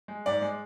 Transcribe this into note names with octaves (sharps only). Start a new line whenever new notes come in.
G#3
G#2 D5
G#3